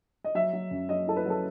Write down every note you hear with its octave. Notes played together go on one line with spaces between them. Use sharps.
D#5
F#3 E5
F#3
F#2
F#3 D#5
E4 A4
B4
F#3 A4